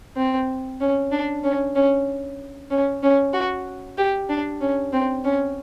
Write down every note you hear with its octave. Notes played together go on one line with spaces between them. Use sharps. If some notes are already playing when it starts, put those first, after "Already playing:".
C4
C#4
D4
C#4
C#4
C#4
C#4
F#4
G4
D4
C#4
C4
C#4